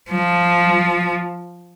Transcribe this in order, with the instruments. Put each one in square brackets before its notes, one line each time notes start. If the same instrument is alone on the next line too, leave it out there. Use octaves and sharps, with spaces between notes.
[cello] F3